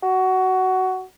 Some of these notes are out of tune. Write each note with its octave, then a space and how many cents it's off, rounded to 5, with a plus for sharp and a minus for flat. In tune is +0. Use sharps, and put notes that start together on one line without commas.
F#4 +15